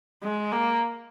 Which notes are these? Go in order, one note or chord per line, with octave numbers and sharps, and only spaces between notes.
G#3
A#3